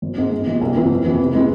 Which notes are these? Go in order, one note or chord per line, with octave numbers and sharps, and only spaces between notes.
G#1
G#2 G#3 C4
G#2
E3 G#3
C2
C3 E3 B3 E4
F2
E3 B3
C3
G#3 C4 E4 B4